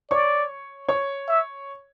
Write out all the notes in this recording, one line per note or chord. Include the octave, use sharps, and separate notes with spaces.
C#5 D5 C#6
C#5 C#6
E5